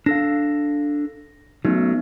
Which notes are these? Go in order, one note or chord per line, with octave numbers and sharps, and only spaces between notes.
D4 A4 F5 A#6
F#3 A3 B3 C#4 D#4